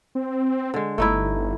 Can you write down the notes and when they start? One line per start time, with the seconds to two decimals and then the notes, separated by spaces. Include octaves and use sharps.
0.15 C4
0.74 D3 G#3
0.98 G1 A3 D#4 E4